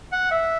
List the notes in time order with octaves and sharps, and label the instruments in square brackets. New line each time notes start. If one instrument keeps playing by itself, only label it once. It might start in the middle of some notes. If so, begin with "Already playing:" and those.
[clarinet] F#5
E5